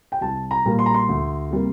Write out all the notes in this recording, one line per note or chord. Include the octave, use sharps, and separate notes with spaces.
G5
C2 A5
A#5
A#2 G3 A#3
C6
A#5
C6
D2
C3 G3 A#3